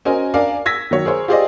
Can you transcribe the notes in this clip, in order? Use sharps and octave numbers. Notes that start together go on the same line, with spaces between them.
C#4 F#4 A#4 C5 D#5 G#5
D4 A#4 D5 F5 G#5
E6 G#6 A#6 B6
D#3 F#3 C#5
G#4 A#4 C5 C#5
F4 G4 G#4 C5 D5 D#5